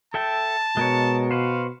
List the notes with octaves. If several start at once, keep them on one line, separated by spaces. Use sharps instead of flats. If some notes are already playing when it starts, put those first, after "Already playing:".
A4 E5 G5 A5
B2 G#3 A#4 C#5
F#4 B4 C5 F5